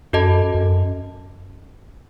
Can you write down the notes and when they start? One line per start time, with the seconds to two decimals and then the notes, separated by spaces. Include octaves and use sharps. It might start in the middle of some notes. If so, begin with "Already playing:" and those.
0.13 F#2 F#4 A4 D#5 A5
0.55 F#2